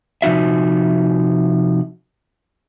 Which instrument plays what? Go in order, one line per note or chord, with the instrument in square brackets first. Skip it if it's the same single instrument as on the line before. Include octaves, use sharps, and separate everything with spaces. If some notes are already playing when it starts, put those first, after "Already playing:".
[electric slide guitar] C3 F3 D#4 F#4 E5